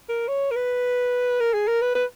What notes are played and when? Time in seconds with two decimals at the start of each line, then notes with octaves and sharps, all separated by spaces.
0.09 A#4
0.28 C#5
0.51 A#4
0.56 B4
1.40 A#4
1.54 G#4
1.68 A#4
1.82 B4
1.95 B4